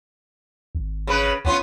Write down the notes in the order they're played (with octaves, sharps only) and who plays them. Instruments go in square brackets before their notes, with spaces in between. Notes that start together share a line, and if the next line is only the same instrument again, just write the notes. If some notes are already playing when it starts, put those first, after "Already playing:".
[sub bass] G#1
[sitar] C#3 B4
[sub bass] B1 [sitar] B3 C#4 F4